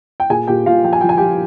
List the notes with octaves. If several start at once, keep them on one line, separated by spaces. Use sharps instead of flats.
G5
A#2 G#4 G#5
A#2 G4 G5
A#2 F4 F5
F3 G5
G#5
F3 G5
G#5
G4 G5
F3